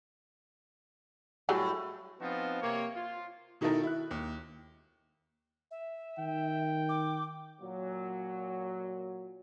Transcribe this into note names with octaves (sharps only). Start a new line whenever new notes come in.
A2 F#3 G3 G#4
F3 B3 C4 D#4 F4 F#4
C3 A#3 C#5
F4
B2 D#3 D#4 E4 A4 A#4
E4 F#6
D#2
E5
D#3 G5
D6
A#2 F#3